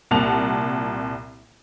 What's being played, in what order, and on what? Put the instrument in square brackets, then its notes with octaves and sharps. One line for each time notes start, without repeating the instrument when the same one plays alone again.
[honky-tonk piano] C2 A#2 F#5 A5 F7